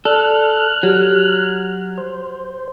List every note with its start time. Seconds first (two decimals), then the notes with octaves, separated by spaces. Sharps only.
0.05 A4 D5 F6 F#6
0.83 F#3 G4
1.98 C5